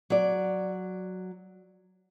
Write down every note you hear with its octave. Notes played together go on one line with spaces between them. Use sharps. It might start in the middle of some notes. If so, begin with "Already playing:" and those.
F#3 D5